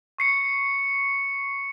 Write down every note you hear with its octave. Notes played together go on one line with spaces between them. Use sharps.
C#6 C7 C#7